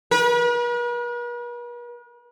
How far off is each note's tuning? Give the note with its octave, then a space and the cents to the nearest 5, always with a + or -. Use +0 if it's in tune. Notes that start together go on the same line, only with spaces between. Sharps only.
B4 -45